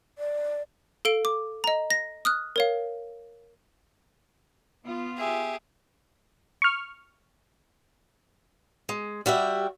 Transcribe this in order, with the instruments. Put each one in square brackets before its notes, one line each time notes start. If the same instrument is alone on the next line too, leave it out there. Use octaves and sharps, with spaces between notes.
[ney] D5
[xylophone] A4 F5 D7 G7
D6
D#5 A#5
A#6
D#6 F6 F#6
A#4 C#5 F5
[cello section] B3 F4
[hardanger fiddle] G4 G#4 [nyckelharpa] E5
[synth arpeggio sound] C#6 F6
[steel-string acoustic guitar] G#3
G3 F#4 G4 E5